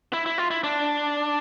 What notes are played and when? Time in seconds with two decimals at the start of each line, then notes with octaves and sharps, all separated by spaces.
0.13 E4
0.26 E4
0.38 F4
0.51 E4
0.64 D4